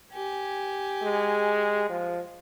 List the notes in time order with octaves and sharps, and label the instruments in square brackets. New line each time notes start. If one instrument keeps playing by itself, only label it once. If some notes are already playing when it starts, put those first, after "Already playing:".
[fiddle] G4 G#5
[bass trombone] G#3
F3